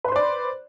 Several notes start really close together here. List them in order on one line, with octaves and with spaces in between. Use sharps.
B4 C6 C5 D5